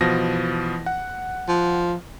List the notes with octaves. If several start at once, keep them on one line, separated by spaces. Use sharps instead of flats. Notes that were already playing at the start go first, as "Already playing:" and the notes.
B2 E3 F3 A#6
F#5
F3